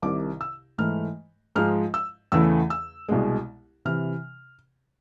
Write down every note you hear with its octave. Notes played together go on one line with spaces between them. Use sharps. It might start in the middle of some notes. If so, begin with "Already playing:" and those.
C2 C3 D#3 D6
E6
G#2 E3 A3 F6
G#2 F3 G#3 F6
E6
E2 C#3 E3 A3 E6
E6
C2 B2 G#3
C3 E3 F6